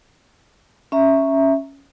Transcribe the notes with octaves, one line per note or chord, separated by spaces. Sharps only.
C#4 E5 A#5